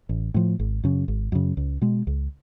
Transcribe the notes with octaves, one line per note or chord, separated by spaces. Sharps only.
A1
A2 F3
G#1
F#2 C#3
G#1
F#2 C#3
C#2
B2 G#3
C#2